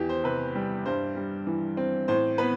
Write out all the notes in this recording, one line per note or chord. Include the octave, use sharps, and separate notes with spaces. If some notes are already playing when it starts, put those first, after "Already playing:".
Already playing: E2 E3 G4
C5
C3 B4
G3
G2 C5
G3
E3
C4
A2 C5
B3 B4